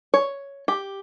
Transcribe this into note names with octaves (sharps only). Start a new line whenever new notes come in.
C#5
G4